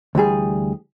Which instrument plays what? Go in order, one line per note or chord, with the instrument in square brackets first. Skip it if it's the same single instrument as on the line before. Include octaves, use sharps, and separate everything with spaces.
[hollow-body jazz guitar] D2 E3 G3 G#4